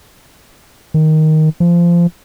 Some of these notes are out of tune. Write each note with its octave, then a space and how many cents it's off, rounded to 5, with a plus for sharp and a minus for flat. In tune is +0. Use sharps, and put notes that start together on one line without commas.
D#3 +5
F3 -20